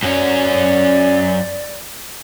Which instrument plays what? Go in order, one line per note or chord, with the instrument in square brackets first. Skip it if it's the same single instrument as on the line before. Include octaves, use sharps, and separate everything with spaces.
[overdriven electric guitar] F#2 C#4 [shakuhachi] D5